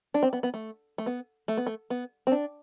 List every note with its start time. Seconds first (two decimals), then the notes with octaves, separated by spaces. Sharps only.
0.14 D4
0.23 C4
0.33 B3
0.43 B3
0.54 A3
0.98 A3
1.06 B3
1.48 A3
1.57 B3
1.66 A3
1.90 B3
2.27 C4
2.32 D4